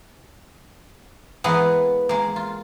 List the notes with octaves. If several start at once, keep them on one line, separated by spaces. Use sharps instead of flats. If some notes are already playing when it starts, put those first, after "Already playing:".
E3 G#3 A#3 B3
G#3 A#3
F4